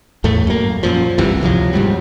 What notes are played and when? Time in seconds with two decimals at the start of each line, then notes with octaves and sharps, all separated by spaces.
0.24 E2 A2 A3
0.47 F#2 A#3
0.83 F#2 A#2 F3
1.18 G1 C2 C3 E3
1.41 D2 C3 F3 F#3
1.73 F#1 G#2 F#3 G3